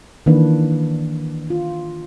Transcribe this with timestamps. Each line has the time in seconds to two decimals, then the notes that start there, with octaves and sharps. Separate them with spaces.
0.26 D#3 E3 A#3 D4 B4
1.50 F4